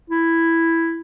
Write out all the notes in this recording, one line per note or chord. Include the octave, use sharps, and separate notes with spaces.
E4